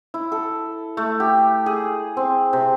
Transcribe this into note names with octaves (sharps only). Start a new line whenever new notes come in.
E4
A4
A3
G4
G#4
C4
C3